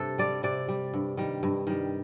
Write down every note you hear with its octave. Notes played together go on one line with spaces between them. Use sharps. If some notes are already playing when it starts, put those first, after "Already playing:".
Already playing: G2 C3 A4
G3 D5
C3 D5
G3
G2
D#3 G3
G2
D#3 G3